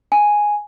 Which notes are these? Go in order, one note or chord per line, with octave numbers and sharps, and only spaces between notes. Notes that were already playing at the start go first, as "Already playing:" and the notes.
G#5